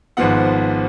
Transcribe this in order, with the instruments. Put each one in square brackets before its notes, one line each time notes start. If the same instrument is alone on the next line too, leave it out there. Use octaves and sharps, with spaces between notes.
[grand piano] G#1 G#2 F3 B3 F#5